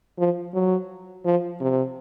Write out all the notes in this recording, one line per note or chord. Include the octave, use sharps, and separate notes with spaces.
F3
F#3
F3
C3